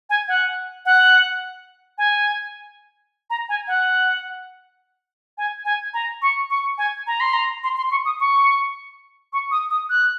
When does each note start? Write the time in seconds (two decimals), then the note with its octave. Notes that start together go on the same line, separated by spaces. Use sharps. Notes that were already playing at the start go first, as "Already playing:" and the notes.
0.10 G#5
0.28 F#5
0.86 F#5
1.98 G#5
3.30 A#5
3.49 G#5
3.68 F#5
5.38 G#5
5.65 G#5
5.94 A#5
6.22 C#6
6.50 C#6
6.78 G#5
7.07 A#5
7.20 C6
7.33 A#5
7.64 C6
7.77 C6
7.91 C#6
8.05 D#6
8.20 C#6
9.33 C#6
9.51 D#6
9.70 D#6
9.90 F#6